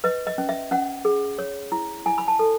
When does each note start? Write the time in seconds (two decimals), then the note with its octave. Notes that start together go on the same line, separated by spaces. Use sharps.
0.04 B4 D#5
0.27 D#5
0.38 C#4
0.49 E5
0.71 C#4 F#5
1.05 G#4
1.38 C#5
1.72 E4
2.06 E4 G#5
2.18 B5
2.28 A5
2.39 A4